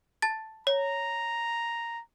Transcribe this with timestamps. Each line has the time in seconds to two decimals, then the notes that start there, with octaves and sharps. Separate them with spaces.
0.22 A5 A6
0.67 C#5 A#5